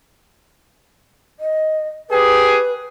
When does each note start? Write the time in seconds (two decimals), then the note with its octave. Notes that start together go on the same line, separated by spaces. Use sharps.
1.40 D#5
2.10 G4 G#4 B4